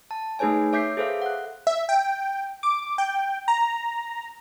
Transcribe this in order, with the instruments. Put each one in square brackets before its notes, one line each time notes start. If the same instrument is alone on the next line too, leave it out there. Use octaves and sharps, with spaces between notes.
[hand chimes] A5
A3 D#4 G#4 B4 C#5 G#5
C#5 E5 D6 G6 B6 C7
G#4 A4 B4 C5 E5 F5
F#5 F#6
[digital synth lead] E5
G5
D6
G5
A#5